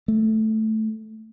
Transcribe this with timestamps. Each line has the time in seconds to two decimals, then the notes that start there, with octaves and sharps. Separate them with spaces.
0.08 A3